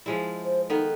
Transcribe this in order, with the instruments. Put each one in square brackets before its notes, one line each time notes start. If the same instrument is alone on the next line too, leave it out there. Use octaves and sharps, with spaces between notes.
[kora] F3 G#3 E4
[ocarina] C5
[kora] D#3 B3 [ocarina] A4